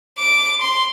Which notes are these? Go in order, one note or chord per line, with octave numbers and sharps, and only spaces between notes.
D6
C6